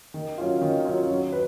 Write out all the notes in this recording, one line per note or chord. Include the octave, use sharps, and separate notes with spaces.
D#3
F#3 C#4 F4
D#3
F#3 C#4 F4
F#3
B4